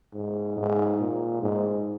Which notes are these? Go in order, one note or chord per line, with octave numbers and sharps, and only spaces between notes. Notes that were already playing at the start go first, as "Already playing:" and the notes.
G#2
G#2
A#2
G#2